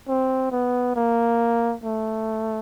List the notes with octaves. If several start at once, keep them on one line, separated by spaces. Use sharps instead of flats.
C4
B3
A#3
A3